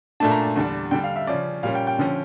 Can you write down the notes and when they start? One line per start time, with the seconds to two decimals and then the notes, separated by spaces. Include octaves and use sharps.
0.20 A#2 A3 D4 A5
0.31 A#5
0.43 A5
0.56 E2 D3 G3 D4
0.91 D3 G3 D4 G5
1.04 F5
1.16 E5
1.27 C#3 F3 C#4 D5
1.63 A#2 G3 C#4 F5
1.75 G5
1.87 G5
1.99 D3 F3 C#4